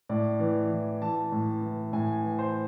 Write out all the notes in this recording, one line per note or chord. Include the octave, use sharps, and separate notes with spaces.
A2 D5
E3
E3
E3 A5
A2
E3
A2 G#5
E3
C5